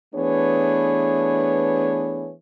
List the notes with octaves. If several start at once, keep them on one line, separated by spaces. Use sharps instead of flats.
E3 A3 B3 D4 G#4 C#5